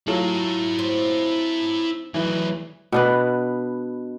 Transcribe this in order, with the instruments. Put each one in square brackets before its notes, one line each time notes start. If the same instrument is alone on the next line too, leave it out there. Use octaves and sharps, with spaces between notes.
[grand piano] F#3 F4 A4 [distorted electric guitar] E4 C#5
[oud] C4
[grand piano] E3 [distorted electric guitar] F#3 A3
[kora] B2 D4 B4